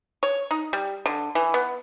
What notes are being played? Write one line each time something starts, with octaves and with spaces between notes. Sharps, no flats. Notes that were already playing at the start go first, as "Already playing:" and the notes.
C#5
D#4
G3
D3
E3
B3